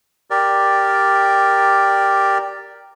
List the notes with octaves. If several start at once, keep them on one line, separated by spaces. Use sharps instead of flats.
G4 A#4 D5